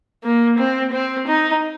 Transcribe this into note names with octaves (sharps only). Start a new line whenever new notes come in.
A#3
C4
C4
D#4